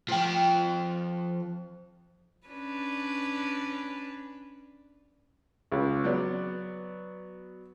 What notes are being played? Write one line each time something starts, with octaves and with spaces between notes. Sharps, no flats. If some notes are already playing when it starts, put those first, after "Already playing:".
F3 G5
C#4 D4 B4
C#2 C#3
F#3 B3 D5